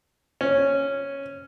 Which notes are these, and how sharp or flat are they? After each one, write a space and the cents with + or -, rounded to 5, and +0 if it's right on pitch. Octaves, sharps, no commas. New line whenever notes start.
C#4 -5